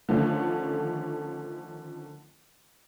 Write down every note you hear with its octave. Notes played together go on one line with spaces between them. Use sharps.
D3 D#3 F3 A3 C#4 D4